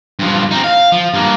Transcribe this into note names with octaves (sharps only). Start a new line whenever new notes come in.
G2 F3
C4 D#4
F5
F3
G2 A#3